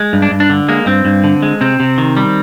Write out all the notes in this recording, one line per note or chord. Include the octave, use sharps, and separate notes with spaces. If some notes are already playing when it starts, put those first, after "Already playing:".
Already playing: G#3
G2
D4
G2
D4
D3
G#3 A#3
G2 C4
G2
D3
G#3
C3 C4
C3
D#3
G3